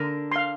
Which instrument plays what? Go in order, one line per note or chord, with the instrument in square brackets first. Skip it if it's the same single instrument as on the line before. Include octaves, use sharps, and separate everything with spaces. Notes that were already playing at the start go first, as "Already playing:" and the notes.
Already playing: [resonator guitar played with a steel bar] D3 [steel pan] A#4
[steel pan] F5 C6